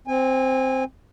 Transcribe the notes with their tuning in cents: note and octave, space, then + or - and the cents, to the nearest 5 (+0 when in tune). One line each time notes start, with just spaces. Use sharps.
C4 -5 G#5 -30